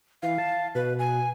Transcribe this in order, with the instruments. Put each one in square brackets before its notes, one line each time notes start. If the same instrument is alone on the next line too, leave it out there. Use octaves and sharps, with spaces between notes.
[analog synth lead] E3 [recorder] F5
[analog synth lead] A5
[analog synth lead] B2 [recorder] B4
[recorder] G#5